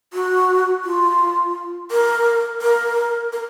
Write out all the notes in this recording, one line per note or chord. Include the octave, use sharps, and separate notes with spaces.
F#4
F4
A#4
A#4
A#4